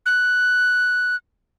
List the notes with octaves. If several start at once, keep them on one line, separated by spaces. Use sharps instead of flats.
F#6